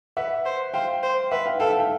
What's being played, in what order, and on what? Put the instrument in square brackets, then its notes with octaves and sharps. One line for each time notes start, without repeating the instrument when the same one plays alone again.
[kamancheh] B4 [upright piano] E5 F#5
[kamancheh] C5
[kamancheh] C5 [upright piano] F5 G5
[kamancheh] C5
[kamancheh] B4 [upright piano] E5 F#5
[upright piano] F5 G5
[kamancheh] A4 [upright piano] F5 G5
[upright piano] E5 F#5
F5 G5